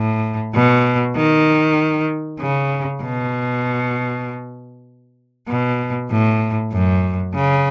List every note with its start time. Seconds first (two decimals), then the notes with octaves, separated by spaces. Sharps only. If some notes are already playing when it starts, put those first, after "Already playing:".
Already playing: A2
0.54 B2
1.16 D#3
2.40 C#3
3.02 B2
5.49 B2
6.10 A2
6.72 F#2
7.34 C#3